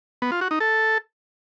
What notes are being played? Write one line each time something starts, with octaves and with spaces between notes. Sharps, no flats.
B3
F4
F#4
D#4
A4